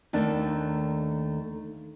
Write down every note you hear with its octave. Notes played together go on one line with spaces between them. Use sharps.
D#2 D#3 A3 D4